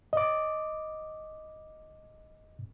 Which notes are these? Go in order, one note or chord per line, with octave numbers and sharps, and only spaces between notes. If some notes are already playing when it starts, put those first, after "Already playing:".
D#5 D6